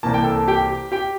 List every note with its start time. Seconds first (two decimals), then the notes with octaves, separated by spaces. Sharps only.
0.03 C2 C3 E3 A#3 A5
0.14 G5
0.24 A4 A5
0.48 G4 G5
0.92 G4 G5